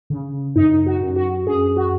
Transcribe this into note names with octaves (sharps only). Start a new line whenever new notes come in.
C#3
F#2 D#4
F#4
F#2
F#4
F#2 G#4
F#4